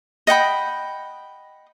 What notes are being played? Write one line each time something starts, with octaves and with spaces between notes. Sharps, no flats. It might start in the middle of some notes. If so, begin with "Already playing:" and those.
D#5 F#5 G5 B5